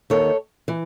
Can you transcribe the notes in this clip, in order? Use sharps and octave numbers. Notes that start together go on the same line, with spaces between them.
D#2 D#3 A4 C#5
E3